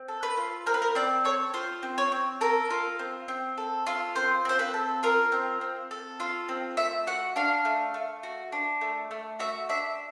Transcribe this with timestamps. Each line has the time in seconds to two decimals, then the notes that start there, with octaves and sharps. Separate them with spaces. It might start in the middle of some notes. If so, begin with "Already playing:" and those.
Already playing: C4
0.08 A4
0.23 B4
0.37 F4
0.66 C4 A#4
0.74 B4
0.82 A#4
0.95 C4 D5
1.25 A4 C#5
1.54 F4 C5
1.83 C4
1.98 C#5
2.12 C4
2.41 A4 A#4
2.71 F4
2.99 C4
3.28 C4
3.58 A4
3.87 F4
4.16 C4 C5
4.45 C4 C5
4.59 B4
4.74 A4
5.03 F4 A#4
5.32 C4
5.61 C4
5.91 A4
6.20 F4
6.49 C4
6.77 A3 E5
7.07 F#4 F#5
7.36 D4 F5
7.65 A3
7.94 A3
8.23 F#4
8.52 D4
8.81 A3
9.11 A3
9.39 F#4 E5
9.69 D4 E5